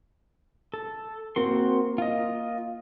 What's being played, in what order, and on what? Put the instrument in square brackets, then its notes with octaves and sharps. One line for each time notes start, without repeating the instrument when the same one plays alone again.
[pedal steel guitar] A4
[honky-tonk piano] A#3 [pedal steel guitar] C4 F#4 C6
[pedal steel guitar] F4 D#5